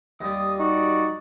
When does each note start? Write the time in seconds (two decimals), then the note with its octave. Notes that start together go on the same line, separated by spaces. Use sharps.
0.21 D#2 G3 D#6
0.59 D#4 F#4 D5